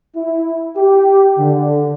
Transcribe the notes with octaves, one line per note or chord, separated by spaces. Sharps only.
E4
G4
D3